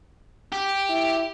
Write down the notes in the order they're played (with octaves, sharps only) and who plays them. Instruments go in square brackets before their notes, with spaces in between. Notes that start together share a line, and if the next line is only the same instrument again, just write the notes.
[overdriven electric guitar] G4
[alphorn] E4